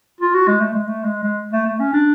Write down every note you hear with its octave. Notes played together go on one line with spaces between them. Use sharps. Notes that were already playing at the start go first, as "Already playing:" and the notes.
F4
F#4
G#3
A3
G#3
A3
G#3
G#3
A3
A3
C#4
D4